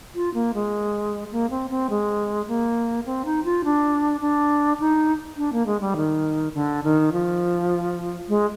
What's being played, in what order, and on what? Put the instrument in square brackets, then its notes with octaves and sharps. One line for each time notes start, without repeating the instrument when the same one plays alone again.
[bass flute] F4
A#3
G#3
A#3
C4
C4
G#3
A#3
C4
D#4
F4
D4
D4
D#4
D4
A#3
G#3
G3
D#3
D3
D#3
F3
G#3